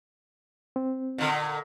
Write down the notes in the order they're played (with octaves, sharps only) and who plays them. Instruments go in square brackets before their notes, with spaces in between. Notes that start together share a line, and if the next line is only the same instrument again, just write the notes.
[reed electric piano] C4
[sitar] A#2 D3